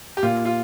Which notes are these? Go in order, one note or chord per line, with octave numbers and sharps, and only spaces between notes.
G4
A#2 F4
F4